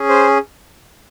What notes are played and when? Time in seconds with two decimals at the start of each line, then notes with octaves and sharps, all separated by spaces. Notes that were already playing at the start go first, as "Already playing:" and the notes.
Already playing: C#4 G#4
0.09 C5